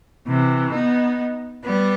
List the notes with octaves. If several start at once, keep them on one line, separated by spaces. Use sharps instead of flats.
C3 E3
B3 D#4
G3 B3